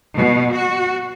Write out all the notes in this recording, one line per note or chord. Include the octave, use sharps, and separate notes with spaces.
B2
F#4